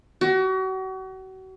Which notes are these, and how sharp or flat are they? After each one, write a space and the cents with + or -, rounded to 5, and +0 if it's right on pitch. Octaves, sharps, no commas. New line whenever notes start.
F#4 +35